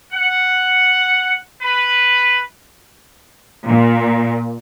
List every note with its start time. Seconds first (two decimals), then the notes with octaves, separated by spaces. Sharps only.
0.13 F#5
1.62 B4
3.68 A#2